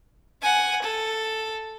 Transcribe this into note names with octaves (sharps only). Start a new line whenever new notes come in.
F#5 G#5
A4